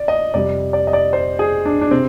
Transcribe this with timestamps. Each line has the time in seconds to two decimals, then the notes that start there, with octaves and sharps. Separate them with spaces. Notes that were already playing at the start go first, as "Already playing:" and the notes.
Already playing: D5
0.08 D#5
0.34 F2 C3 G3 D5
0.73 D5
0.87 D#5
0.93 D5
1.13 C5
1.39 G#4
1.65 D4
1.81 D4
1.91 C3 C4